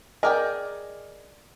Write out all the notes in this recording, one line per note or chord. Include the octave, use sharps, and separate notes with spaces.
G#4 A#4 D5 D#5 G5